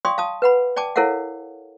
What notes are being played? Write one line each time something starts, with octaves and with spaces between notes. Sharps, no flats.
D5 F5 G5 C6 C#6 D#6
F5 A5 D#6
B4 F#5 B5
D5 G5 A5 D6
E4 A4 A#4 C#5 F5 F#5